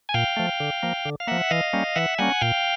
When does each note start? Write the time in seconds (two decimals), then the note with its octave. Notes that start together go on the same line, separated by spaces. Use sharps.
0.09 G#5
0.14 A#2 F5 G5
0.37 F3 A3
0.60 D3
0.83 F3 A#3
1.05 D3
1.20 F5
1.27 F3 A#3 E5 F#5
1.51 E3 D#5 F5
1.73 G3 A#3 C#4
1.96 E3 E5 F#5
2.18 G3 A#3 C#4 F#5 G#5
2.41 A#2 F5 G5